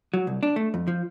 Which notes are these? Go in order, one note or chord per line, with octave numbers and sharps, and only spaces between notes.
F#3
C2
D4
A3
F2
F3